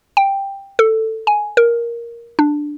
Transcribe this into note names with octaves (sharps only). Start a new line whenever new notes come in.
G5
A4
G#5
A#4
D4